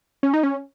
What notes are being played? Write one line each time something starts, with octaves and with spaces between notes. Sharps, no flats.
C#4
D#4
C#4